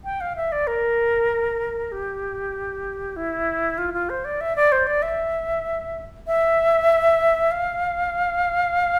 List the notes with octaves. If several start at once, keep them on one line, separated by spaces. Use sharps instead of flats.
G5
F5
E5
D5
A#4
G4
E4
F4
F4
C5
D5
E5
D5
C5
D5
E5
E5
F5